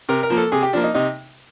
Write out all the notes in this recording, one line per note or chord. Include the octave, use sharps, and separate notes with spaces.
C3 A#4
A#4
F3 A#3
A4
C3 G#4
G4
F3 A#3 D4
D#4
C3 D#4